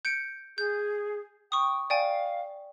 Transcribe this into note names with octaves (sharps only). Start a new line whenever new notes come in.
G6 C#7 D7
G#4 G6
G5 C#6 D#6
D5 F5 G5 G#5